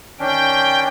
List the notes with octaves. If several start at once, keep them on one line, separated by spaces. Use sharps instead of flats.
D#3 C#4 D4 G5